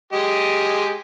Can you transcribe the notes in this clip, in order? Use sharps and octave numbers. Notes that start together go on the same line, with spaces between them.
G#3 G4 D#5